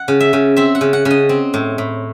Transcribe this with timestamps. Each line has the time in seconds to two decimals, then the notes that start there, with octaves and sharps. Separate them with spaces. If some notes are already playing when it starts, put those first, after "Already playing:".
Already playing: F#5
0.08 C#3
0.20 E5
0.33 C#3
0.56 C4 E5
0.75 F#5
0.81 C#3
0.93 F#5
1.05 C#3
1.11 D#5
1.29 C4
1.54 A2
1.78 A2